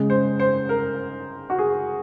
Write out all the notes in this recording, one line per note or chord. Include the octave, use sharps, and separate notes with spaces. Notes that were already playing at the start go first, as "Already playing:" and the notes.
Already playing: C#3 G#3
C5
C5
A#4
F#4
G#4